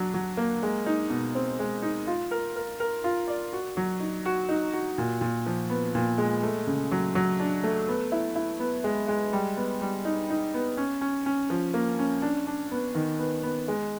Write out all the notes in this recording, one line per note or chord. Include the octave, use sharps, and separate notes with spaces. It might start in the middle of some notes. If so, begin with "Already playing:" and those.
Already playing: F#3 D4
F#3
A#3
G#3
D#4
B2
C4
G#3
D#4
F4
A#4
A#4
A#4
F4
D5
F#4
F#3
D#4
F#4
D#4
F#4
A#2
A#2
F3
B3
A#2
G#3
A3
C#3
F#3
F#3
D4
A3
B3
E4
E4
B3
G#3
G#3
G3
B3
G3
D#4
D#4
B3
C#4
C#4
C#4
F3
A#3
C#4
D4
D4
B3
D#3
B3
B3
G#3